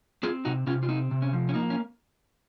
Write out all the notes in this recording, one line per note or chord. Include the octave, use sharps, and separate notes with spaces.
C4 F4 G#4
C3 D#4 F#4
C3 C#4 F4
F4
C4 D#4
C3
C#4
F3
C#4
A#3 D#4
C#4